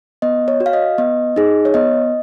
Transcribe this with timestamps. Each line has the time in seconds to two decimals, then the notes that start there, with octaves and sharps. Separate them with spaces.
0.22 B3 D#5
0.48 C#5
0.60 F#4
0.66 F5
0.73 D#5
0.98 B3 D#5
1.36 D#4 G#4
1.65 C#5
1.74 B3 D#5